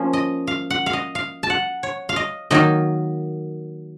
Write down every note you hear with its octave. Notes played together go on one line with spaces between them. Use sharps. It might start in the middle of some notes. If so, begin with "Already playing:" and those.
Already playing: F3 A#3 C#4
D#5
F5
F#5
F5
D#5
F5
A5
F#5
C#5
F5
D#5
D#3 F#3 A#3 D#4 D#5